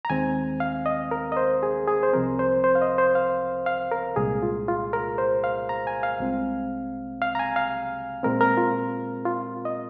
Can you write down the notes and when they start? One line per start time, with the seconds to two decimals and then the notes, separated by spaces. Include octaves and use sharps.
0.05 A#5
0.10 D#2 D#3 G#3 C4 G#5
0.60 F5
0.86 D#5
1.11 A#4
1.32 D#5
1.37 C5
1.63 G#4
1.88 G#4
2.03 C5
2.13 C2 C3 F3 C4 A#4
2.39 C5
2.64 C5
2.75 F5
2.82 D#5
2.98 C5
3.15 F5
3.66 F5
3.91 A#4
4.16 C2 A#2 G#3 G#4
4.43 F4
4.68 F4
4.93 A#4
5.18 C5
5.44 F5
5.69 A#5
5.87 G#5
6.03 F5
6.20 C2 C3 G#3 C4
7.22 F5
7.35 A#5
7.39 G#5
7.56 F5
8.23 A#2 G#3 C4 A#4
8.41 A#4
8.57 F4
9.25 F4
9.65 D#5